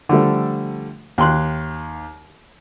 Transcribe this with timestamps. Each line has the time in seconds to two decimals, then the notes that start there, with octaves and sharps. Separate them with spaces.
0.09 D3 F3 G3 A3
1.18 D#2 G5 C6 F#6